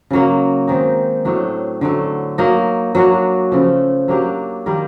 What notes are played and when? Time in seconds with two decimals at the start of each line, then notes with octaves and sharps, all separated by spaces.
0.11 C#3 F#3 A#3
0.67 D#3 G#3 C4 D#4
1.25 A2 F#3 A3 D4
1.81 D3 F#3 A3
2.38 F#3 A#3 D#4
2.95 F#3 A#3 D4 F#4
3.52 C#3 F3 A3
4.08 F#3 A#3 D4 G4
4.66 D#3 G3 A#3